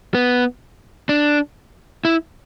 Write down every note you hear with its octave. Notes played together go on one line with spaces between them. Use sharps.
B3
D4
E4